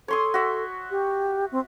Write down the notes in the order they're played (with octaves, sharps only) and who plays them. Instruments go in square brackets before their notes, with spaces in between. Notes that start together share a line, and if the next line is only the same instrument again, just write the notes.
[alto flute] A4 [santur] C#5 C6 D#6
[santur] F#4 E5
[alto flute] G4
C4